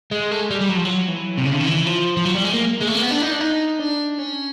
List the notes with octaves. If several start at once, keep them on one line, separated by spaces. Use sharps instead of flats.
G#3
A3
G#3
G3
G3
F#3
F3
F#3
E3
C3
C#3
D3
D#3
E3
F3
F3
F#3
G3
G#3
A#3
G#3
A3
A#3
B3
D4
D#4
D4
D#4
D4
C#4